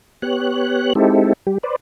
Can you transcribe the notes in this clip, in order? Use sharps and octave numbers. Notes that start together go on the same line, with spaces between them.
B3 G4 C#5 F#6
G#3 C4 D#4 E4 G4 A4
G3 G4
B4 C5 D5